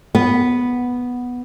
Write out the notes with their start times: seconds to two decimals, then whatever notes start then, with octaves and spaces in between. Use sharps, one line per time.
0.15 B3